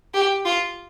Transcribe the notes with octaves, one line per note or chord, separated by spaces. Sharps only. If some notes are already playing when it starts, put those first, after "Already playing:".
G4
F4